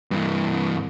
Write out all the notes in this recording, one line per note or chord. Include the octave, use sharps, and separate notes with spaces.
G2 E3